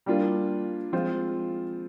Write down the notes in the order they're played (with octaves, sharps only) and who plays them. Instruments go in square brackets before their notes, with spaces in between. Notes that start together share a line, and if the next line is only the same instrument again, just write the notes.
[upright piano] G3 A#3 D4 F4
F3 G#3 C4 F4 C5